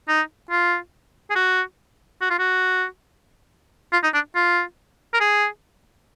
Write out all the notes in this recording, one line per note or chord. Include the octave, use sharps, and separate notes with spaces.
D#4
F4
G#4
F#4
F#4
F4
F#4
F4
D#4
D4
F4
A#4
G#4